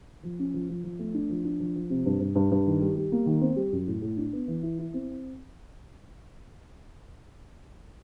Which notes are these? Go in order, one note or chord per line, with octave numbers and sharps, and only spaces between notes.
F3
C#4
F3
F3
F3
A3
D4
F3
D4
F3
F3
C3
G2
G2
G2
G2
D#3
G3
G3
A#3
D#3
C4
G3
F#2
A2
A2
D4
B3
E3
E4
E4
C4